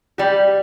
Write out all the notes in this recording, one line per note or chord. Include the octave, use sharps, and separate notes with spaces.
G3 G4